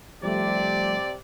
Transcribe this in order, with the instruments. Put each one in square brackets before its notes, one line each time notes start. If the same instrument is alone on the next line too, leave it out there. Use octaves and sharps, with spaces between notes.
[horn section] C3 D5 [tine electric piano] F3 G3 A3